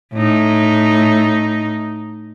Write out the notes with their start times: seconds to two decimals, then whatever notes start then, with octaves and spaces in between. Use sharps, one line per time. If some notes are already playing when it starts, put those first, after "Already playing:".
0.13 A2 D#4